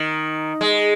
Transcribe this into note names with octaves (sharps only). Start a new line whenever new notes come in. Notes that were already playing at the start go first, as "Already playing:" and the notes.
Already playing: D#3
G#3